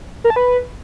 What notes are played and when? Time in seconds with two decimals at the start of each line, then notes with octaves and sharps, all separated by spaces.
0.24 A#4
0.30 A5
0.36 B4